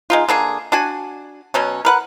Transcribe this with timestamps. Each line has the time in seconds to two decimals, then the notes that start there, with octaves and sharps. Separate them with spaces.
0.10 G#3 D#4 F4
0.29 D3 A#3 G#4
0.72 D4 F#4 G#5
1.54 B2 F#3 C#4
1.85 A#4 B4 F#5